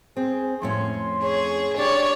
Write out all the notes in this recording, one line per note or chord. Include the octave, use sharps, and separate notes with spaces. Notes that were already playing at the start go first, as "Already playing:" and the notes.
C4 G#4
F2 A2 C#4 C6
G#4 C#5
D4 G4 C#5 D5